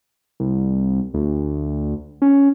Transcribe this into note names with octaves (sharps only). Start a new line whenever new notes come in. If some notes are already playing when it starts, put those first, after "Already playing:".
C2
D2
C#4